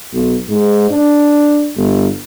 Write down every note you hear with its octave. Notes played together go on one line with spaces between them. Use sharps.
B1
G#2
D4
G1